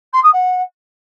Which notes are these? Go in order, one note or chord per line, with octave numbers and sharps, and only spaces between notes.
C6
D#6
F#5